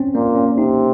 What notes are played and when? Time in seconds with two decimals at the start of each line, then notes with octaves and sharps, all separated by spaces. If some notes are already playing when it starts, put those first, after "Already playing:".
Already playing: C4 C#4
0.15 A#2 A#3
0.36 C#4
0.57 C3 D#4